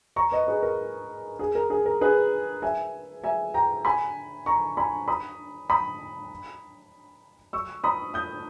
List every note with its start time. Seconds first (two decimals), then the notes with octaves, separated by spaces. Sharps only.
0.16 A#5 C#6
0.32 B4 D#5
0.47 G#4 B4
0.63 A#4
1.39 G#4
1.55 A#4
1.70 G#4
1.86 A#4
2.01 G#4 B4
2.62 E5 G#5
3.24 E5 G#5
3.54 G5 A#5
3.85 G#5 B5
4.46 A#5 C#6
4.77 G#5 B5
5.08 B5 D#6
5.70 B5 D#6
7.53 C#6 E6
7.84 B5 D#6
8.14 D#6 G6